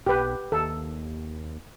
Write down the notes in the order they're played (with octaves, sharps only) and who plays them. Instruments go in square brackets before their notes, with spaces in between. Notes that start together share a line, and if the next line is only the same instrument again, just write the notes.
[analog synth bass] B1 [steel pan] G4 B4
[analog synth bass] D#2 [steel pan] A4